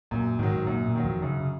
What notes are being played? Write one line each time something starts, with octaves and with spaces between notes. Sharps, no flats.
F#2 A#2
G#2 D#3 F#3
G#2
F#2 A#2
A#2
D#3 F#3
F2
F#2 C#3
C#3